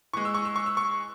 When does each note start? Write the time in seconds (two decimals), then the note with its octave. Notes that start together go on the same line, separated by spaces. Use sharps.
0.13 E3 G#3 C#6
0.25 E6
0.34 C#6
0.45 E6
0.56 C#6
0.66 E6
0.77 C#6